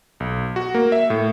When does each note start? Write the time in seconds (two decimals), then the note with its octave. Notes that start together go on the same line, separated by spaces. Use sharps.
0.20 B1
0.56 F#4
0.75 A#3
0.92 E5
1.10 A2